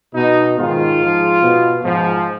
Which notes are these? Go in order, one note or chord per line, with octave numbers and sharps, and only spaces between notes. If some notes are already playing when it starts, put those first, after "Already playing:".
B2 D#4
G#2 D#3 F4
G#2 F3
B2
G#2 F3